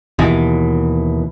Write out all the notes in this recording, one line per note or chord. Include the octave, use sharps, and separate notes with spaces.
D#2 B2 E3